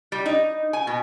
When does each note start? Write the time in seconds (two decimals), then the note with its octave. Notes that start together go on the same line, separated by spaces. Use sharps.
0.12 G3
0.26 D#4
0.73 G#5
0.87 B2